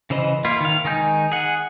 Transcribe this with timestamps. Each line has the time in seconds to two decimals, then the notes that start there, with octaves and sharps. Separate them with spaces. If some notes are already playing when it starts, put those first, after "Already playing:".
0.10 C#3 E3 C5 D#5
0.45 A#3 E4 F4
0.61 D#3 F5
0.85 D#3 G#3 D#4 G#5 G6
1.32 G#4 F#5